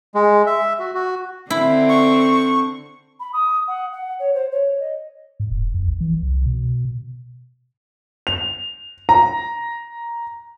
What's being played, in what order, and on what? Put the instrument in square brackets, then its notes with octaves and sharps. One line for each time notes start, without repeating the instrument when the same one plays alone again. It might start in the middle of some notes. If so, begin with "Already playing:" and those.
[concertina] G#3
E5
F#4
F#4
[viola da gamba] D3 C4 [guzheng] E4
[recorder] C#6
[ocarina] B5
D#6
F#5
F#5
C#5
C5
C#5
D#5
[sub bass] G#2
E1
F2
A#1
E3
C2
B2
[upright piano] F7
A#5